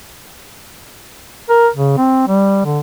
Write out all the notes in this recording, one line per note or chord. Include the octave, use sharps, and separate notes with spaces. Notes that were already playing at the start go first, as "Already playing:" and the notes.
A#4
C#3
C4
G3
D3